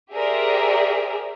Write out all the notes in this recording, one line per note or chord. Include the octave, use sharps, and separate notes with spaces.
G4 G#4 A#4 C5 D5 E5